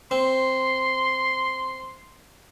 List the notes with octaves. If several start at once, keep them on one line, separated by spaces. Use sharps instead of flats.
C4 C6